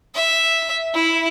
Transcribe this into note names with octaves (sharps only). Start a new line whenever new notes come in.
E5
E4